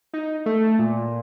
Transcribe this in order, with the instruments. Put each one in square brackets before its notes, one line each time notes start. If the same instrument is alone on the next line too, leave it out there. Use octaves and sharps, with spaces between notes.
[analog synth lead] D#4
A3
A#2